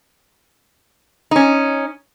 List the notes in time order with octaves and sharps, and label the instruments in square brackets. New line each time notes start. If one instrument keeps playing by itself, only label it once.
[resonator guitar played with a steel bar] C#4 D#4